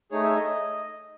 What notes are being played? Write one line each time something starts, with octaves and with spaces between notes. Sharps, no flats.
A3 D#4 G#4 C#5
E5
C#5
D#5